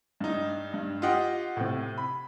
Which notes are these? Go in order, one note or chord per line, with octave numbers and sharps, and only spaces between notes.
G2 D#4
G2
F4 G4 D#5 F#5 G5
A2 C3
B5